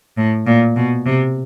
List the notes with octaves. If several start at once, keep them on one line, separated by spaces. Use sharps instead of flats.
A2
A#2
B2
C3